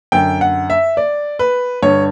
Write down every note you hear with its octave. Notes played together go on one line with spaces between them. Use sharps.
F#2 D3 G5
F#5
E5
D5
B4
G2 D3 C#5